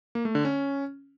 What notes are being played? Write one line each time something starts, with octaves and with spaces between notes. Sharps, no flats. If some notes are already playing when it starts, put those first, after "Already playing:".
A#3
A3
D3
C#4